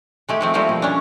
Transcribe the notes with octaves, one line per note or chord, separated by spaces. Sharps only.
G#3 A3 G4
F3 A3 C4
F3 G3 A3 A#3 C4
B2
C#4 D4